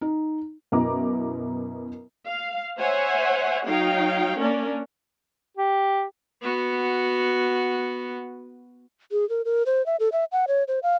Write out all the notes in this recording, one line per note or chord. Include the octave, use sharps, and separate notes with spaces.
D#4
F#2 B2 E4 A#5 D6
F5
C5 C#5 E5 F#5 G#5
F#3 D#4 C#5 F5 G5
A#3 C#4 D4 A#4 D5
G4
B3 F#4
G#4
A#4
A#4
C5
E5
A4
E5
F#5
C#5
C5
F5